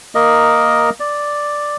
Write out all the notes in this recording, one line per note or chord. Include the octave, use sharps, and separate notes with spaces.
A#3 A#4 D#5
D5